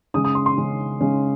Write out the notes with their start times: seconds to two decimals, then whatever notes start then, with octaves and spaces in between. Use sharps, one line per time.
0.14 C#3 G#3 C#4 D#6
0.24 D#6
0.35 C6
0.46 C6
0.57 C#3 G#3 C#4
1.01 C#3 G#3 C#4